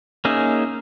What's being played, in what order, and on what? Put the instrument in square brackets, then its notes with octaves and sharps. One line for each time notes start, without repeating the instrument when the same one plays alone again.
[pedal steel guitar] A#3 C#4 D#4 G#4 E5